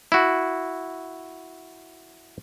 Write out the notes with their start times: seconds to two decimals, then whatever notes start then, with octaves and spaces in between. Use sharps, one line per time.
0.12 E4 F#4